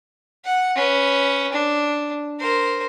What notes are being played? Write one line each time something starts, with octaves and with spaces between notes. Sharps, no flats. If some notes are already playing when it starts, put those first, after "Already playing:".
F#5
C#4 B4
D4
A#4 C5